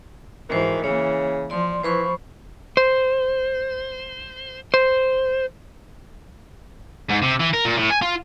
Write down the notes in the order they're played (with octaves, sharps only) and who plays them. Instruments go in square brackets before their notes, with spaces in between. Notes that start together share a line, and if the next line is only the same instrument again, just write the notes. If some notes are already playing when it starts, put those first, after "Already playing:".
[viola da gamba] G#2 E3 [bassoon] D#3 [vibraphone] F#4 C5
[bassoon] C#3 [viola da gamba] E3 A#3 [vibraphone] C#5
[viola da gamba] F3 [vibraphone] D5 C6
[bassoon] E3 [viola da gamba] F3 [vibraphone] C5 B5 C#6
[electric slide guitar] C5
C5
[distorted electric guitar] G#2
C3
E3
A#4
A#2
A2
G#5
F4